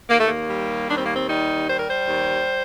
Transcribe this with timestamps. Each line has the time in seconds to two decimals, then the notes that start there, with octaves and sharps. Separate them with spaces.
0.10 D#2 A#3
0.20 A3
0.29 A#3
0.50 G3
0.89 D#2 D4
0.98 C4
1.06 A#3
1.16 C4
1.28 G3 D#4
1.68 G3 C5
1.79 A#4
1.90 C5
2.08 D#2